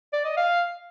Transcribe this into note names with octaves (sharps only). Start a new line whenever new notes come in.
D5
D#5
F5